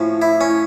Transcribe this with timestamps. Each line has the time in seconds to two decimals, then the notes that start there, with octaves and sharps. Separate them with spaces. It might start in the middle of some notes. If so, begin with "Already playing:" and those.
Already playing: A2 F3 C#4
0.22 E4
0.41 C#4